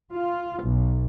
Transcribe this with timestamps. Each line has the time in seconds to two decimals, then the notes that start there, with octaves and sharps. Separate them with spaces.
0.11 F4
0.61 B1